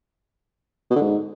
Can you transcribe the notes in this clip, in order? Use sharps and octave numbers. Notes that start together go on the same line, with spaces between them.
B2
D3
G#2